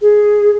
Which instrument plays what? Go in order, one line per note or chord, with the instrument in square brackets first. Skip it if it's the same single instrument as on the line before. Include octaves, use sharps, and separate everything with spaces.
[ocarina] G#4